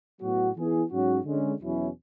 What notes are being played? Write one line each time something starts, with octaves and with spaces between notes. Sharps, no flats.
A2 F#3 B3 F#4
E3 B3 E4 G#4
G#2 F#3 C#4 F#4
D3 G#3 C#4
E2 B2 F#3 C#4 E4